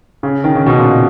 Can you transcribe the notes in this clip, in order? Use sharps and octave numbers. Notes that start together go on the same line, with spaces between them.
C#3
D#3
C#3
B2
A#2